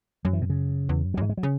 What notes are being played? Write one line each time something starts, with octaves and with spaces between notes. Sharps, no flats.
F#2 F#3
E3
B2
C#3
E2
F#2
F#3
F#2
G#2 E3
G#3
F#3
C#3